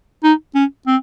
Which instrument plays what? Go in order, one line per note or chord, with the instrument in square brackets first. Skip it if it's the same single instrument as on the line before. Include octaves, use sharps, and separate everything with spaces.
[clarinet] D#4
C#4
C4